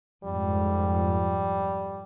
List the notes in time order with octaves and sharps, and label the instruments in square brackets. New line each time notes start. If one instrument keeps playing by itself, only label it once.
[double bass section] F2 G#2 [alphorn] G3